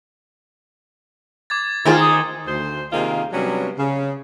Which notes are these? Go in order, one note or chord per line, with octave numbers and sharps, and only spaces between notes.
D6 G#6 A6
D#3 F4 G#4 C5 A#5
D#6
D2 C5
C3 D#3 A#3 C4 F4 G#4
C3 F#3 G3 B3 C#4 D4
C#3